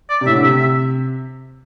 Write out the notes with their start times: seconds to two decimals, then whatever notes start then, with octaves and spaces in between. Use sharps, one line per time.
0.10 D5
0.21 C3
0.26 A2 E5
0.35 D3
0.42 C3 E5
0.59 E5